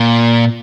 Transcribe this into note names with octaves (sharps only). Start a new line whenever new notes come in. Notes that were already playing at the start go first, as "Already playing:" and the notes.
Already playing: A#2